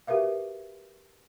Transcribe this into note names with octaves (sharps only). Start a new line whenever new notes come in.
F#4 G4 A#4 B4 E5 F5